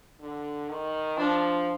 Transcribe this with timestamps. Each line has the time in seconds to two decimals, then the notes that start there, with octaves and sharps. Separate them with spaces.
0.21 D3
0.69 D#3
1.17 F3 D4